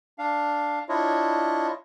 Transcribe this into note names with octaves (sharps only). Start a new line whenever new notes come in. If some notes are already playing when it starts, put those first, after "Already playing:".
D4 F5
D4 E4 F4 C#5 D#5